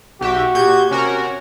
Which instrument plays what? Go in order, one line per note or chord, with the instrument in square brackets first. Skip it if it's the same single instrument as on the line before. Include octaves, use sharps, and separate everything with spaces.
[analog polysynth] B1 G4 E5 [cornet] F#4
[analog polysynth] A#2 G6 G#6 [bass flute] G4
[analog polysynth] C3 F#4 A#4 [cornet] C#4 [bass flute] C#5